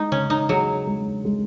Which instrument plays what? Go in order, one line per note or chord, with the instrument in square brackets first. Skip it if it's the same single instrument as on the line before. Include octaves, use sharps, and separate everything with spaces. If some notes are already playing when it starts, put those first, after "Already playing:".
Already playing: [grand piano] G#3 [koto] D#4
[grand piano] C#3 [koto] C#4
[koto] D#4
[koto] F#3 [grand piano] G#4
[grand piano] G#3
G#3